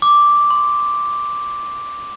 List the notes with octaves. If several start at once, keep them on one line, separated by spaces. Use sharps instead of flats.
D6
C6